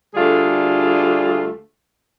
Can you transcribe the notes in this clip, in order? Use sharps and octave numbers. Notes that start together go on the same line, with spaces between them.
D2 D3 G3 A3 F4 G#4